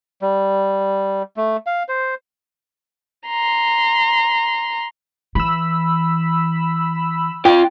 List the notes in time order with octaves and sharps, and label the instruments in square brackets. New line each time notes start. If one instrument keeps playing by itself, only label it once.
[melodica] G3
A3
F5
C5
[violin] A#5 C6
[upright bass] E3 [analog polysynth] B5 E6
[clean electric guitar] F4 G5